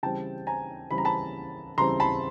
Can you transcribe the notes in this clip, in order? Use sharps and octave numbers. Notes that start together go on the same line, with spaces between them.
C#3 E3 G3 C4 G5 A5
G#5 A#5
C#3 E3 G3 C4 B5
A#5
A5 B5
C#3 E3 G3 C4 A#5 C6
A5 B5